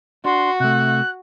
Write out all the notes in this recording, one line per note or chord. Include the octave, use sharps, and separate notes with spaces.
D4 F#4 C6
C3 A3 F#6